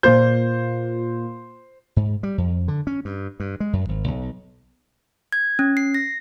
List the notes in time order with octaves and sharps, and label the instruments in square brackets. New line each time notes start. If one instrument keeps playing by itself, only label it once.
[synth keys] A#2 A#3 F4 [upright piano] C5 G6
[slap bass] G#2
G3
F2
D3
C#4
G2
G2
G#3
F#2
G#1
B1
[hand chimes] G#6
C#4
C7
A#6